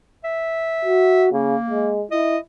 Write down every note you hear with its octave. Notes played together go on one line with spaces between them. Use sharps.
E5
F#4
C#3 A#3
G#3
E4 D#5